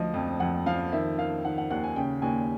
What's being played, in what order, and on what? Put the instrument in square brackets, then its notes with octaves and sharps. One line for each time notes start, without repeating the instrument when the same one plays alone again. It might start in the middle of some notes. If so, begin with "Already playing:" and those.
Already playing: [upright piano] D2 F3 D#5
F2
F2 F#5
F3 F5
D#3 E5
D#3 F5
D#3 F#5
F#5
D#2 F#5
G#5
C#3 G5
D#2 G#5